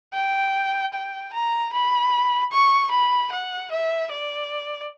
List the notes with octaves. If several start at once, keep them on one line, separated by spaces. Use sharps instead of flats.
G5
G5
A#5
B5
C#6
B5
F#5
E5
D5